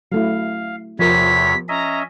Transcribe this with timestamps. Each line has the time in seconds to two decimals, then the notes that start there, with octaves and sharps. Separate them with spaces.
0.12 F#3 A3 E4 F5
0.99 E2 C3 F3 A#4 C#5 B6
1.69 C#4 D#5 E5 A#5